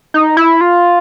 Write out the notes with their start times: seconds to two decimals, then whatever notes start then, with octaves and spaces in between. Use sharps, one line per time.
0.14 D#4
0.37 E4
0.61 F4